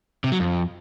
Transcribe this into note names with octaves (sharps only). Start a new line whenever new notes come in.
C3
F#3
F2